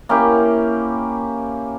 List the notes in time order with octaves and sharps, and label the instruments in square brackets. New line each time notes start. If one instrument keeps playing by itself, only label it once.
[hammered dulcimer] A#3 C#4 E4 G4